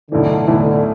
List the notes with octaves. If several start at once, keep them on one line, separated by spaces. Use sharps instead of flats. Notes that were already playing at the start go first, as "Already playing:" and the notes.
B1 A2 D3 E3
B1 A2 D3 E3